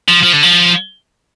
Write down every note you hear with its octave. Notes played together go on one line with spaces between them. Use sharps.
F3
F3
D3
F3